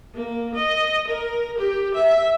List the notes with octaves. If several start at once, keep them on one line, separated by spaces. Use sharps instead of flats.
A#3
D#5
A#4
G4
E5